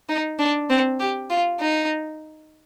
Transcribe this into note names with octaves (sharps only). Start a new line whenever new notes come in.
D#4
D4
C4
G4
F4
D#4